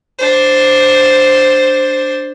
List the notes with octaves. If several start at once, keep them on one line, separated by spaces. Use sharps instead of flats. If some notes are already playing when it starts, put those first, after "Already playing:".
D4 C5